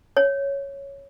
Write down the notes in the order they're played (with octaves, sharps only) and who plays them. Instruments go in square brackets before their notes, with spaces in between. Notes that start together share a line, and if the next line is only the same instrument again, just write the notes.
[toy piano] C#5